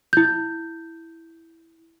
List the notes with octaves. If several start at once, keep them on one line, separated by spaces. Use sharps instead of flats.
E4 G6